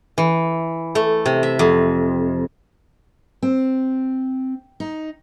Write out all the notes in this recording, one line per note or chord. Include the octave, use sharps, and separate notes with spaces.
E3
A3
C3
E5
F2
C4
D#4